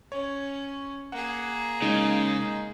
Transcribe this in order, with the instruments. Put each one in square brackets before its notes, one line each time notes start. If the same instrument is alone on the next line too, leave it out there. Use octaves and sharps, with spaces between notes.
[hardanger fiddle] C#4 [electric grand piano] C#5
[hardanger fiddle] A#3 G#4 [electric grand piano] F#5
[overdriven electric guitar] C#3 [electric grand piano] G#3 D#4